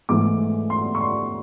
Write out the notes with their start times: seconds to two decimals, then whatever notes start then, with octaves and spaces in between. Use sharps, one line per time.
0.09 G#2 E3 A3 D6
0.70 C6
0.95 C#6
1.01 C6